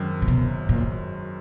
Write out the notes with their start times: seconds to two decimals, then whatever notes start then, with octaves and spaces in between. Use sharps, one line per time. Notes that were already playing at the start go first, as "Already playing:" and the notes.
Already playing: G#1 F#2 D#3
0.22 A#2
0.28 B2
0.69 A#2